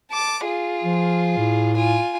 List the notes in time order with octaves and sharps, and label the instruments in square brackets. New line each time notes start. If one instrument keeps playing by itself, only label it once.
[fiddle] A5 D6
F4 G#4
[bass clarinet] F3
A2
[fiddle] F4 G#5